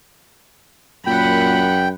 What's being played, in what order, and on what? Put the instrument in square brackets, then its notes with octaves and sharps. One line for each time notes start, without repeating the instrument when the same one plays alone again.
[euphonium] F#2 [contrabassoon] A#2 [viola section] F#5 B5 [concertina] G5